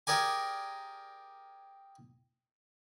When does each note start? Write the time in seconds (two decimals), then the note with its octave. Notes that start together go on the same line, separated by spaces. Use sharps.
0.07 G4 G#4 A#4 D5 G#5